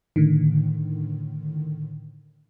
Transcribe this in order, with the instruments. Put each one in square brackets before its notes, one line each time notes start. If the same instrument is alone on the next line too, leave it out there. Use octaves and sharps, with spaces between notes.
[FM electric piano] A2 D3 D#3